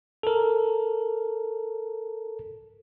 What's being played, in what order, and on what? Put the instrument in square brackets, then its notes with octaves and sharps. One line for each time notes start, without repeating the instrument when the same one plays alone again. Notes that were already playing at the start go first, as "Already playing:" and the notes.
[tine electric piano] A4 A#4